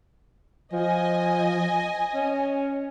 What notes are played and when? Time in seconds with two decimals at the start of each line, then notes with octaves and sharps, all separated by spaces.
0.72 F3 D#5 G#5
2.14 C#4